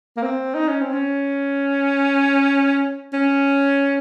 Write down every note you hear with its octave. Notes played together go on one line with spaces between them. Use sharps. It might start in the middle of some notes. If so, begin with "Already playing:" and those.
A#3
C4
D#4
C#4
C4
C#4
C#4